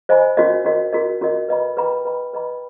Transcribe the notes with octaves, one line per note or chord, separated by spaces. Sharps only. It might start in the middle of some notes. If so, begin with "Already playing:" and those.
C5 D#5 G#5 B5
C#4 F#4 A#4 D#5
C#4 F#4 A#4 D#5
C#4 F#4 A#4 D#5
C#4 F#4 A#4 D#5
B4 D#5 G5 B5
B4 D#5 G5 B5
B4 D#5 G5 B5
B4 D#5 G5 B5